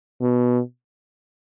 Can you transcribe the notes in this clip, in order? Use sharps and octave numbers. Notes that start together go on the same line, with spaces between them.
B2